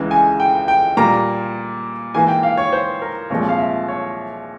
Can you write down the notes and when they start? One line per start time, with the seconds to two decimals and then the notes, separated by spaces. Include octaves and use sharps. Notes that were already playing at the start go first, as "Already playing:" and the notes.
Already playing: C#2 C#3 E3 G#3
0.11 G#5
0.40 G5
0.68 G5
0.97 A#2 G3 A#3 A#5
2.14 G#2 E3 A#3 G#5
2.28 G5
2.43 F5
2.57 C#5
2.73 C5
3.02 A#4
3.30 C2 A#2 F3 G#3 C#5
3.49 F5
3.59 E5
3.88 C#5